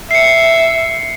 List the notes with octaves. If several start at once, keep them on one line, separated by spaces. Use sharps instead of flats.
E5 C7 C#7